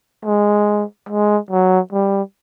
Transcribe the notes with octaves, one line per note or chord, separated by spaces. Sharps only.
G#3
G#3
F#3
G3